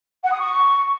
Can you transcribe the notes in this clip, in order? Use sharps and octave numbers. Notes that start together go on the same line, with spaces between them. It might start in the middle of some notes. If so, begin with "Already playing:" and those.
F#5
D#6
C#6